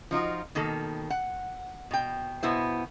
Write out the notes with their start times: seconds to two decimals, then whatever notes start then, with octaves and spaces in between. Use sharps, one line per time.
0.11 F3 D#4 F4 F#4
0.55 B2 D#3 A#3 A4
1.10 F#5
1.91 B2 G5
2.43 B2 B3 E4 C5